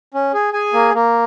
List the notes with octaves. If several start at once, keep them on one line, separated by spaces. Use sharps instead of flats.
C#4
G#4
G#4 G#5
A#3
A#3